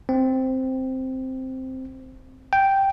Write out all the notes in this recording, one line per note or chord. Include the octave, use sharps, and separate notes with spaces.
C4
G5